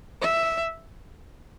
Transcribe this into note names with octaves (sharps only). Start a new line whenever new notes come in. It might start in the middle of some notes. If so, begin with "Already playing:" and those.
E5